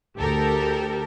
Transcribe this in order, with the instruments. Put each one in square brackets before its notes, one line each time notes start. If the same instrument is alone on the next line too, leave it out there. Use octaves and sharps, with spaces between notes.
[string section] D2 G4 A4 A#4